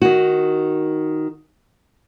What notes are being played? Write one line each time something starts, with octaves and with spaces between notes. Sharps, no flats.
D#3 F#4